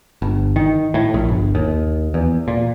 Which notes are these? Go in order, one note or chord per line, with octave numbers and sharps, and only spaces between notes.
G1
D#3
A2
A#1
G1
D#2
E2
A#2